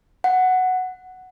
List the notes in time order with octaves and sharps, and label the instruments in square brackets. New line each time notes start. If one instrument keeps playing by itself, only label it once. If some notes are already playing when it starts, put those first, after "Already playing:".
[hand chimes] F#5